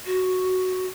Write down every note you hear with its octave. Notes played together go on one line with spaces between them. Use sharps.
F#4